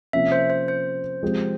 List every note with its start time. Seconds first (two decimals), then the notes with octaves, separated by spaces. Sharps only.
0.13 C3 F3 A#3 C#4 E5
0.32 C5
0.50 C5
0.68 C5
1.23 F3 G#3 C4 G4